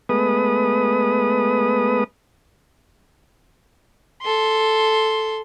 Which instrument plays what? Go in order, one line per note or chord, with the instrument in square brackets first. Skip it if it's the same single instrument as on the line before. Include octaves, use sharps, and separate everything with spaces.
[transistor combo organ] G#3 A3 B3 B4 D#6
[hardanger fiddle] A4 C6